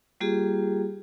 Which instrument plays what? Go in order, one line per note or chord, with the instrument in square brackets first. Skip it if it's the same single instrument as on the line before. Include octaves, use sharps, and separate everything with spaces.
[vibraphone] G3 A#3 F4 G4 G#4